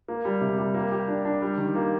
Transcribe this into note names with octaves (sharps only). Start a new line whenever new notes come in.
A#3
G3
C3
G3
A#3
G4
D4
D4
G3
D#3
A#3